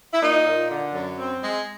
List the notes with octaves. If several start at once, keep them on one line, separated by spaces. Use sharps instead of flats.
E4
A#2 D#4
A#2
D3
F#2
C4
G#3